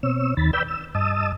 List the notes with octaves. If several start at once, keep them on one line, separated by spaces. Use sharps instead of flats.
B2 C4 C#5 E6
D#2 D#3 B5 A6
B4 D5 G5 B5 E6 G6
E6
G2 D#5 A5 D#6 E6